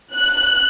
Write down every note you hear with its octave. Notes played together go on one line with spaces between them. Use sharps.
F#6